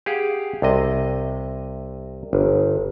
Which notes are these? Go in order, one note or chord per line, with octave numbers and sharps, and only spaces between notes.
G4 G#4 F5 F#5
C2 C3 D#5
G1